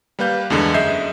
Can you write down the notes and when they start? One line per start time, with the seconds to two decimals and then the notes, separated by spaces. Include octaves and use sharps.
0.19 G3 A#3 B4 F5 G6
0.50 E2 G2 D3 G#3
0.74 F#2 G#4 D#5 E5 G6 C7